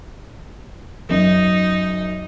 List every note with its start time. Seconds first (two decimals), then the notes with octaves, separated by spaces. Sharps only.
1.09 F#2 D#4